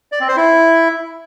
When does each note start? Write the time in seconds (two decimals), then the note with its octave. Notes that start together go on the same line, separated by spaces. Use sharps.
0.12 D5
0.20 C4
0.28 C5
0.37 E4